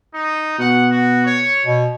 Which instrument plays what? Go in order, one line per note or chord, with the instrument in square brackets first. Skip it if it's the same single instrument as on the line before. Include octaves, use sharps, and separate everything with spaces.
[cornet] D#4
[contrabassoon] B2 [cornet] F#5
[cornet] F#4
C#5
[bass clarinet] B2